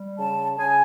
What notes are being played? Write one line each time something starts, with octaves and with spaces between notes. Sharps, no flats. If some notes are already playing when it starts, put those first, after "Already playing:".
Already playing: G3
C#3 A5
C#3 G#5